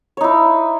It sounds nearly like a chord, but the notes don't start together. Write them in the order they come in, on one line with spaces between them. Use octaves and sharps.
C#5 D#4 E4